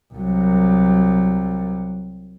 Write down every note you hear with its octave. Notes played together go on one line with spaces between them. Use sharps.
C2 F#3